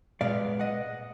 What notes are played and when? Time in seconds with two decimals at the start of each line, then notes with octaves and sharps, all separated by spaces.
0.21 A#2 G#3 B3 D5 F5
0.59 D#5 F#5